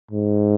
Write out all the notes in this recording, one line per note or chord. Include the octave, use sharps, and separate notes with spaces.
G#2